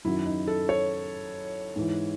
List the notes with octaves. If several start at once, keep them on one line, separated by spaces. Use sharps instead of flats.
F#2 D#3 F#3 E4
D#4
A4
C#5
G#2 E3